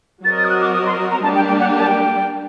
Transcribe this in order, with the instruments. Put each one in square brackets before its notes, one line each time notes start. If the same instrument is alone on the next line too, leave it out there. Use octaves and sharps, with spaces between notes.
[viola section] F#3 C4 F#4 A#4 D#5 [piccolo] A6
[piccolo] A6
D#6
F#6
D6
D#6
C6
A#5
[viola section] G3 A#3 D4 G4 [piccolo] A5
[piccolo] G5
G5
F#5
G5
A5
G5